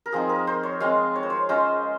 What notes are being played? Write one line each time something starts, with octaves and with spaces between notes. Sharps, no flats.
A#4
F3 C4 D#4 G#4
A#4
C5
C#5
G#3 C4 F4 F5
C#5
C5
C#5
G#3 C#4 F4 C5